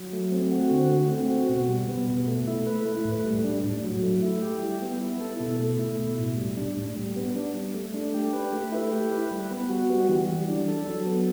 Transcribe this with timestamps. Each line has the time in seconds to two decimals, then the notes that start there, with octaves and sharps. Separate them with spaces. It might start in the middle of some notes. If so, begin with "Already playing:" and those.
Already playing: F#3
0.13 A3
0.32 C4
0.52 F#4
0.71 D3
0.90 A3
1.10 C4
1.29 F#4
1.49 B2
1.68 G3
1.88 B3
2.08 B2
2.27 A3
2.47 E4
2.66 B4
2.85 A3
3.05 A2
3.25 G3
3.44 D4
3.64 A2
3.84 F#3
4.03 A3
4.22 E4
4.42 G4
4.62 G3
4.82 B3
5.01 E4
5.20 A4
5.40 B2
5.60 A3
5.79 E4
5.99 B2
6.18 A2
6.37 G3
6.57 D4
6.77 A2
6.96 G3
7.16 B3
7.35 D4
7.55 G3
7.74 A3
7.94 D4
8.14 G4
8.33 B4
8.53 A3
8.72 E4
8.91 G4
9.12 B4
9.31 G3
9.51 B3
9.69 F#4
9.90 G3
10.09 E3
10.28 G3
10.48 D4
10.68 A4
10.87 F#3
11.06 B3